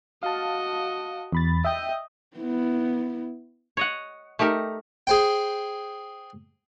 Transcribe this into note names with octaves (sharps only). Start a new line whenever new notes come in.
F#4 D#5 F5 A5
E2 B5 A6
D#5 E5 G5 D#6
B3 E4
C#5 D#5 F#5
A3 D#4 G4 A#4
G#4 C5 G5